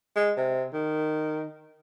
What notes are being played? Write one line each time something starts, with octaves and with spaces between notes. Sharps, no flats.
G#3
C3
D#3